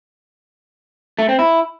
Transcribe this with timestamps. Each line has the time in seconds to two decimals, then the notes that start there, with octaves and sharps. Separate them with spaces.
1.19 A3
1.29 C4
1.39 E4